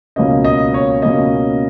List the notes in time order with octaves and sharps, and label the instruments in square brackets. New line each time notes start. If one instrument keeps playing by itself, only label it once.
[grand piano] C#2 B2 A#3 C#4 D#5
D#5
C#5
C#2 B2 A#3 C#4 D#5